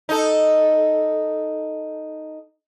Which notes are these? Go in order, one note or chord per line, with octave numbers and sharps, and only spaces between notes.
D#4 A4